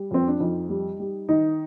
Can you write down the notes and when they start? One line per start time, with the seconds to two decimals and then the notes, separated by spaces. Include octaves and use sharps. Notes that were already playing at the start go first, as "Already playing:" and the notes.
Already playing: G3
0.11 F2 C4
0.27 D4
0.40 F2 D#4
0.69 G3
1.00 G3
1.29 D#3 D#4